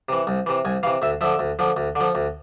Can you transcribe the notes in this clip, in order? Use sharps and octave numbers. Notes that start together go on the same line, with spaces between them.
C3 E3
C2
C3 E3
C2 G#5
C3 E3 F5
D2 E5
D3 F3 E5
D2
D3 F3
D2
D3 F3
D2